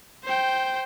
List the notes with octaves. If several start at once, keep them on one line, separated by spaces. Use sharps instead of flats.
C5 G5